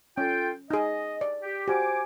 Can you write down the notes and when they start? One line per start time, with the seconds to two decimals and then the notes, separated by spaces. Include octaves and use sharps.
0.18 C#4 F4 A4 G5
0.71 D#4 G#4 D#5
1.21 D5
1.42 G4
1.68 F#4 G4 C5 G#5 D6